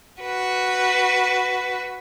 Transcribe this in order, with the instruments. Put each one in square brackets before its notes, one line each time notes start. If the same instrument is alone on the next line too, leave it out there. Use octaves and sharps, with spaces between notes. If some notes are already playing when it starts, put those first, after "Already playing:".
[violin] F#4 B4